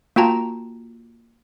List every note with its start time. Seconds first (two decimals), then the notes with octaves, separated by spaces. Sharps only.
0.16 A#3 F4 F#4 G5 A5 A#5